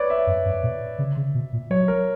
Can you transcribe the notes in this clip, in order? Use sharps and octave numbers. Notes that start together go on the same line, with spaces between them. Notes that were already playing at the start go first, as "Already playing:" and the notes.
Already playing: B4 C#5 D5
E5
F#2
F#2
A#2
C#3
C#3
B2
A#2
F#3 C#5
A#4